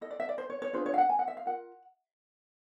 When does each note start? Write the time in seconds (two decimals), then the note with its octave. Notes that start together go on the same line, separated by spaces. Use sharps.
0.01 E4 A4 D#5
0.11 D5
0.20 E5
0.29 D5
0.38 C5
0.50 C#5
0.62 C#5
0.73 D4 F4 G#4 B4 C5
0.86 C#5
0.94 F5
0.98 F#5
1.09 G#5
1.19 F#5
1.28 E5
1.37 F5
1.46 F4 A#4 F#5